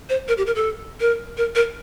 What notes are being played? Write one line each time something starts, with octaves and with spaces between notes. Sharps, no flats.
C5
A#4
G4
A#4
A4
A#4
A#4
A#4